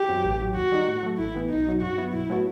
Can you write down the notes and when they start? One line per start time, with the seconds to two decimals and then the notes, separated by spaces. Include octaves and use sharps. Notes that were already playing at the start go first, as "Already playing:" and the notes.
Already playing: G4
0.09 F#2 F#3 C4
0.25 A1
0.40 A2 F#3
0.56 D#2 F#4
0.72 D#3 G3 D#4
0.87 A2
1.03 F#3 A3
1.18 A1 E4
1.34 A2 E3 B3
1.50 B1 D#4
1.66 B2 F#3
1.82 G2 F#4
1.97 F#3 B3 E4
2.13 B1 E4
2.29 A2 F#3 B3 F#4